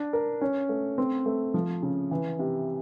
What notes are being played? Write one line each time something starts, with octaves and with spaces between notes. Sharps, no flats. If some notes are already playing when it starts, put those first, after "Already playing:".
Already playing: D4
A#4
C#4
A3
C4
A3
F3
C#3
E3
C3